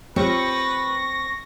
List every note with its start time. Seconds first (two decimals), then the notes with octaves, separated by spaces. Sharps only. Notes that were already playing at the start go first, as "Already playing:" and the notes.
0.16 C4 F4 G4 B4 C#5 C#6 A#6